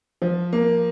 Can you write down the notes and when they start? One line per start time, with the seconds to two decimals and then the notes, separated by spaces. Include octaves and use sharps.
0.22 F3
0.53 A#3